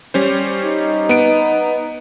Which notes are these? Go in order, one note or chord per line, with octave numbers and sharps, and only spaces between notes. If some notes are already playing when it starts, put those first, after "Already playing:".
G3 C#4 C5
D#4
B3 D7